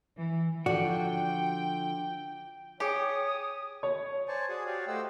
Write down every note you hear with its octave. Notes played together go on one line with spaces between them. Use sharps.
E3
D3 F3 F#4 D5 G5
G4 G#4 C#5 G5 G#5 D#6
C#5
C5 D5 G#5 A5 C#6
F#4 G#4 D5 D#6
F#4 G4 C#5 D5 F5
A3 G4 C5 D#5 F#5 E6